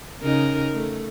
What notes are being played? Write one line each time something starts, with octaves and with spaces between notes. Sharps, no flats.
C#3 D#4 A#4
A3